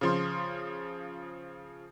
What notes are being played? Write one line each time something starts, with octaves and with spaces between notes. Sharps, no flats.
C#3 F3 C6